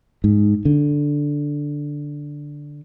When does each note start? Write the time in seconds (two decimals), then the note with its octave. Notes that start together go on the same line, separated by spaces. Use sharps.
0.24 G#2
0.65 D3